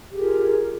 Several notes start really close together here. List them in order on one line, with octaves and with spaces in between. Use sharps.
G4 G#4 A#4 F4